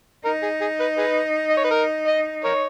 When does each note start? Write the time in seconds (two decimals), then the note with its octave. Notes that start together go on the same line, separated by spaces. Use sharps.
0.25 D#4 A#4
0.43 G#4
0.61 G#4
0.80 B4
0.98 G#4 B4
1.50 D#5
1.57 C#5
1.64 B4
1.71 A#4
2.07 D#5
2.44 A#4 C#5